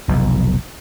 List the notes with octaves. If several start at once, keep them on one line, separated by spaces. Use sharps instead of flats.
F1 B1